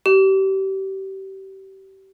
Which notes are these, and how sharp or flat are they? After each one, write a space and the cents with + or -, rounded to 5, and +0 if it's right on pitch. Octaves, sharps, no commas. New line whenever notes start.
G4 -30